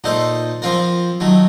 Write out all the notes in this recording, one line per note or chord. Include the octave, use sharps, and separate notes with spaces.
A#2 A3 D#4 A4 C5
F3 C4 F4 A#4
D#3 F#3 A3